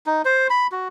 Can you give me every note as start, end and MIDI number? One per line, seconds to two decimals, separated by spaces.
0.06 0.22 63
0.25 0.47 72
0.50 0.67 83
0.72 0.88 66